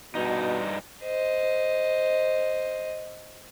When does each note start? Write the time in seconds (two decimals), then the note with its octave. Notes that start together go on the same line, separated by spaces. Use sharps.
0.15 G2 B2 D#4
1.05 C5 D#5